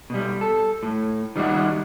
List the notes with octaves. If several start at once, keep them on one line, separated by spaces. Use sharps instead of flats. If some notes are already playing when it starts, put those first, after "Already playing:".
B2 G3
A4
A2
D#3 G3 D4 D#4 F#4